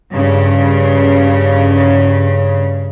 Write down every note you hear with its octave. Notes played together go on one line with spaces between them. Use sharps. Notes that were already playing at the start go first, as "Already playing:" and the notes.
G2 C#3